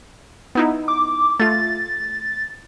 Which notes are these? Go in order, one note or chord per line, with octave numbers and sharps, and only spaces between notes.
B3 D#4 E4
D6
A3 F4 A6